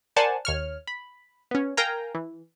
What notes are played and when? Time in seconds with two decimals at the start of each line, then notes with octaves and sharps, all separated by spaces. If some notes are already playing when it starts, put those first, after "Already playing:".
0.16 A#4 C5 D5 F#5 G#5 A5
0.45 D#2 C#5 F6
0.87 B5
1.51 B3 C#4
1.77 A#4 F5 G5 G#5 A#5
2.15 E3